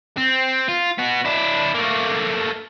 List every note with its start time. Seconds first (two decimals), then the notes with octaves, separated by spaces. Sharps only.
0.18 C4
0.69 F4
0.99 B3 F#4
1.25 D4 E4
1.74 A3 A#3